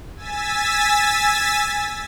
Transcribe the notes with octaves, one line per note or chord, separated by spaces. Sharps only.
G#5 E6 A6 B6